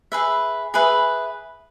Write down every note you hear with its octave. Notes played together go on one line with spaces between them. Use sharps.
G#4 B4 E5
G#4 B4 E5